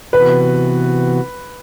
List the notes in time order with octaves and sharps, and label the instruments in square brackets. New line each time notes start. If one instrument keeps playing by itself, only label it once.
[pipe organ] C3 E3 B3 F#4 [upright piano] B4